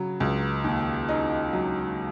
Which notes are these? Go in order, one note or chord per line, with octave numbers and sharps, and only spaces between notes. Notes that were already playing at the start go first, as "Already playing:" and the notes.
Already playing: C#3 F#3
C#2
D#2
D#4
F#3